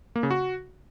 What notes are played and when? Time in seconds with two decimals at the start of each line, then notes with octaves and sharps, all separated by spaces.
0.16 A#3
0.23 C#3
0.31 F#4